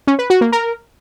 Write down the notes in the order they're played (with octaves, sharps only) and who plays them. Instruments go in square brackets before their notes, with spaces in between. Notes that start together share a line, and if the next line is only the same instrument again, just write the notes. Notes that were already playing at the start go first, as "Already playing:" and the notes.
[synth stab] C#4
B4
F#4
A#3
A#4